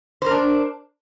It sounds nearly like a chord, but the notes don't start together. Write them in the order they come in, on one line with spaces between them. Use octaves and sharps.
C5 A#4 D4